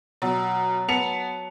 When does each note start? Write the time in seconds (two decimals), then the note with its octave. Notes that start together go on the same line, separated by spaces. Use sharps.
0.22 B2 F#3
0.88 B3 A5 C#7 F7